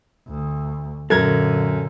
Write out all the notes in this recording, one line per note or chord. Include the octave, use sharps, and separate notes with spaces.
D2
F#2 A#2 D3 A4 A#4 G#6